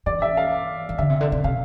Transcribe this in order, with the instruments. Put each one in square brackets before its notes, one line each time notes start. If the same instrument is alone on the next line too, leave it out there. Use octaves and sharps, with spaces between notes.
[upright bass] E3 [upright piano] D5
[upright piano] E5
F5
[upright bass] E3
[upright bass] D3 [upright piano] E5
[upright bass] C3
D3
C3
[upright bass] B2 [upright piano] F5